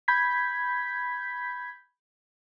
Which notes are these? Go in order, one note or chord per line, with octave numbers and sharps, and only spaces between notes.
B5 G6 G#6 B6